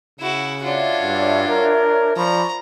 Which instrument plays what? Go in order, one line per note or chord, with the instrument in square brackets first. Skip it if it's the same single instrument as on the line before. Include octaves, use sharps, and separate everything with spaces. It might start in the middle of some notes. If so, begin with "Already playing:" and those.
[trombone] C#3 [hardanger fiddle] E4 F#4
[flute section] D4 C#5 E5 [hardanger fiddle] F4 F#4
[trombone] G2
A#4
[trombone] F3 [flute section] D5 B5 C#6 [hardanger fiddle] A#5